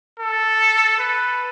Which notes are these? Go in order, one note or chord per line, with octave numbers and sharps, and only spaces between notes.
A4
B4